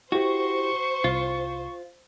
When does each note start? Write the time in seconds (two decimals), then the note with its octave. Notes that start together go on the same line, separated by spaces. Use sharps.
0.12 E4 F#4 G4 C5 C#6
1.04 C2 F4